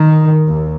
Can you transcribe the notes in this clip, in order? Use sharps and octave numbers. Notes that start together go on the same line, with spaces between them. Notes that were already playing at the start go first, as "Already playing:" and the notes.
Already playing: D#3
D#2